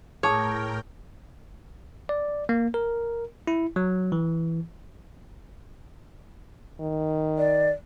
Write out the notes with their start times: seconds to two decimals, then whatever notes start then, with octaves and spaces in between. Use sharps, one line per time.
0.23 A2 G#4 A#4 C#5 G5 A5 D#6
2.09 D5
2.49 A#3
2.74 A#4
3.47 E4
3.76 F#3
4.12 E3
6.80 D#3
7.38 D5